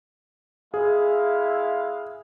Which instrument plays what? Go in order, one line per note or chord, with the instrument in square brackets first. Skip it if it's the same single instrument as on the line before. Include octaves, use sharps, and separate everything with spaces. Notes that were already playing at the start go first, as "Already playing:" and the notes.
[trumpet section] G#3 E4 F5 [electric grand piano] G#4